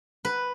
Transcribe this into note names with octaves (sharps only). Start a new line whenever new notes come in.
B4